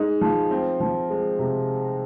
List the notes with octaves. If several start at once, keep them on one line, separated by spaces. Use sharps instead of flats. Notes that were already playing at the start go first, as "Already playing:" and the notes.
Already playing: G#3 D#4
F3
C4
F3
G#3
C3